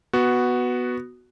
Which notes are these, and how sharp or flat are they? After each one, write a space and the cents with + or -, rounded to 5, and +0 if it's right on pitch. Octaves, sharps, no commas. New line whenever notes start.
B3 +0 F#4 +0